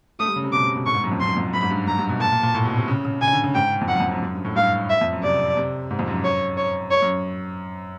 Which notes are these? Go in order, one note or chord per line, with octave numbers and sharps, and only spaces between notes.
A3 D#6
G3
C#3
C3
B2 D6
C3
B2
A2 C#6
G#2
F#2
F2
F#2 C6
F2
F#2 B5
G#2
G2
G2 A#5
G2
B2
A#2 A5
A#2
A#2
A2
B2
C3
C#3
C#3
C#3 G#5
D3
C#3
G#2 G5
F2
F#2 F#5
F2
F#2
F#2
G2
A2
G2 F5
E5
F2
F#2
C3 D5
C3
G#2
F2
F#2
C#5
C#5
C#5
F#2